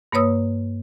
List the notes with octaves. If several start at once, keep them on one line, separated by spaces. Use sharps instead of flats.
G2 A#3 B4 C#5 D#6 E6